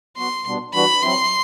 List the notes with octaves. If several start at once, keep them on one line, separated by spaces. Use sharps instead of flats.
F#3 B3 F#4 C6
B2 G3 B3 D4
E3 G3 B3 D4 F#4 B5
F#3 C4 E4 C6